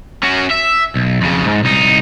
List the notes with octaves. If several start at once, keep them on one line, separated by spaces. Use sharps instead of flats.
C#4 F#4
E5
B1
F2 C#3
G#2
C2 D#4